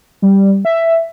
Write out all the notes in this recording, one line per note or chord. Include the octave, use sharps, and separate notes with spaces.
G3
E5